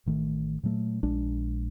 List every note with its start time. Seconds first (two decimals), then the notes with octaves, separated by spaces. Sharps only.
0.06 A1 D#3 A3
0.63 A#2 F#3 A3
1.03 A#1 G#3 D4